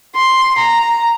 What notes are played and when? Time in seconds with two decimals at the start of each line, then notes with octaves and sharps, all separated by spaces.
0.16 C6
0.59 A#5